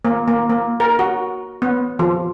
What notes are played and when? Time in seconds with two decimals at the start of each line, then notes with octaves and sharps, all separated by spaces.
0.05 A#3
0.28 A#3
0.50 A#3
0.80 A#4
0.99 F#4
1.62 B3
1.99 F3